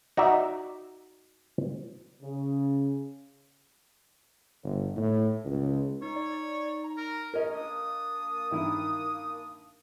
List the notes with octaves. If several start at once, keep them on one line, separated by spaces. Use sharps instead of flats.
D#4 F#4 D5 E5
C#3
G1
A2
C#2
D#4 C#5
D5
A#5
A#4
C#4 A#4 D#5
A#3 D4 D#6
G2 D#3 E4